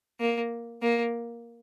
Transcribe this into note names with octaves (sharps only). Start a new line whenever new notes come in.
A#3
A#3